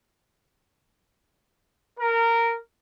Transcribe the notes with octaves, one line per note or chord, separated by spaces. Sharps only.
A#4